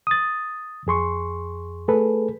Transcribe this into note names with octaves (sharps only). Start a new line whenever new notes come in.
D#6 A6
F2 G#4 C6 C#6
A3 G#4 A4 B4